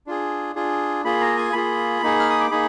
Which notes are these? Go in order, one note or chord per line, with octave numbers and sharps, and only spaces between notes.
D4 F4 G#4
D4 F4 G#4
A#3 F4 G#4 B5
A#5
G#5
A#3 F4 G#4 B5
A#3 D#4 G#4
F6
D#6
D6
A#3 D#4 G#4 B5